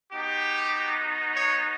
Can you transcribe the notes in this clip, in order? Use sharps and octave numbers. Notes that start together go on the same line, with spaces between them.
B3 D#4 F#4 G4
C#5